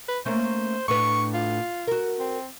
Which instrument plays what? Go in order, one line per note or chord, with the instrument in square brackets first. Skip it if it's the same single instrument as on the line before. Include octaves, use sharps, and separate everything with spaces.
[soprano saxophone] B4
[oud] A3 A#3 C#4 [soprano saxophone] C5
[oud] A2 D4 B4 [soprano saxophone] C#6
[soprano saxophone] F4
[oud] F#4 A#4
[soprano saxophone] C4